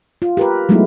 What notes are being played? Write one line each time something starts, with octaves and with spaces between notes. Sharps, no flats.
F4
G4 A#4 B4
F#3 G#3 A3 B3 D#4 E4